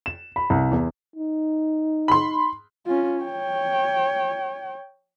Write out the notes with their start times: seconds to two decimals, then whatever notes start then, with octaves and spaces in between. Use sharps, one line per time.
0.06 E7
0.36 B5
0.50 C2
0.72 E2
1.16 D#4
2.08 B5 C6
2.86 C#4 F4
3.21 C#5 G5